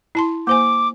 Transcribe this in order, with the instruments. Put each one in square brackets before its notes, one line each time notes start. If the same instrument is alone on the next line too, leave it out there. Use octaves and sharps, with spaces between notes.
[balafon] E4 A5 C6
[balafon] A#3 C5 G#5 [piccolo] D6